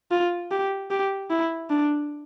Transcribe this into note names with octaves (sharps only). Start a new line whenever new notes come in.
F4
G4
G4
E4
D4